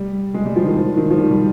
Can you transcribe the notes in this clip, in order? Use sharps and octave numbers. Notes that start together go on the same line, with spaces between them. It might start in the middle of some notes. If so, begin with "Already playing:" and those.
Already playing: G3
G#3
G3
F3
D#3
F3
D#3
F3
G3
G3